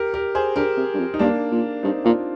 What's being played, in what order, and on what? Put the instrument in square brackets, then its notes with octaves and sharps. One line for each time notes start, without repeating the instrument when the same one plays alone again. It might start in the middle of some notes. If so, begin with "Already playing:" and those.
Already playing: [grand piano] G4 A#4
G4 A#4
G#4 C5
[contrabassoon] D3 [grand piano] G4 A#4
[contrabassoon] C3
G2
F2
[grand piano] D#4
[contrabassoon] G2 [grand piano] A#3 D4
[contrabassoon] A#2
[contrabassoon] G2 [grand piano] C4 D#4
[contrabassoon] A#2 [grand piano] D4 F4